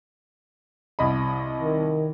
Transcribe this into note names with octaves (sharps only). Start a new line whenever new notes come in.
C2 D#5 B5
D#3